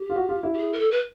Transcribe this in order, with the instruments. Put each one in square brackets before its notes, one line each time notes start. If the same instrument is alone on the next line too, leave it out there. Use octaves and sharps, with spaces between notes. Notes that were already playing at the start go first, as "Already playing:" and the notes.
Already playing: [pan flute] G4
[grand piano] F4
F#4
F4
E4
[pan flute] G4
G#4
A#4
A4
B4